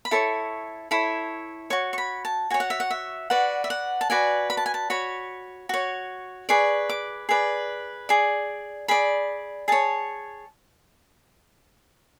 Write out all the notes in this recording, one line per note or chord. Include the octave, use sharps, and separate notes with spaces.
B5
E4 A4 C#5 C#6
E4 A4 C#5
F#4 C#5 C#6
C#6
B5
A5
F#4 C#5 G#5
F#5
E5
F#5
E5
F#4 B4 D5 F#5
E5
F#5
A5
F#4 B4 D5 G#5
B5
A5
G#5
A5
F#4 C#5 B5
F#4 C#5
G#4 B4 D5 C#6
D6
G#4 B4 D5
G#4 D5
G#4 D5 B5
G#4 C#5 A5